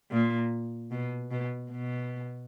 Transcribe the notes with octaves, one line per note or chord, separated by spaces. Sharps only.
A#2
B2
B2
B2